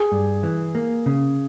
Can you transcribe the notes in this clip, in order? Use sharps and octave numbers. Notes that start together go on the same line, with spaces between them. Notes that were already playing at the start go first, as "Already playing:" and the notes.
Already playing: G#4
G2
E3
A#3
C#3